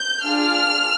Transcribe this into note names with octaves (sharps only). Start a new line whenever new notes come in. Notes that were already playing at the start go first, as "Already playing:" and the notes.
Already playing: G6
D4 F4 G#4 F6